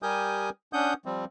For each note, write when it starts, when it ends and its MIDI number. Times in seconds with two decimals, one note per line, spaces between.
0.02 0.50 55
0.02 0.50 67
0.02 0.50 70
0.02 0.50 80
0.02 0.50 87
0.02 0.50 91
0.73 0.94 61
0.73 0.94 62
0.73 0.94 78
0.73 0.94 87
0.73 0.94 91
1.05 1.25 53
1.05 1.25 55
1.05 1.25 60